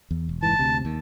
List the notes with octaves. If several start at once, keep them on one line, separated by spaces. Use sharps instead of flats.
E2
E1
F#1 G#2 E3 A5
D2 C3
D#2